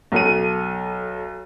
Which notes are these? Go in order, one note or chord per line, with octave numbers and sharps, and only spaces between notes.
B1 A4 D#7